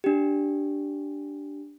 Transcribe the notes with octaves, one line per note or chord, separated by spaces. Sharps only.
D4 G4